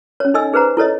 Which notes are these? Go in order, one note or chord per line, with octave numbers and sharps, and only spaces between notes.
C#4 C#5
D#4 A4 D#5 G#5 E6
D#4 G#4 B4 C5 F#5 A#5
E4 A4 C#5 D#5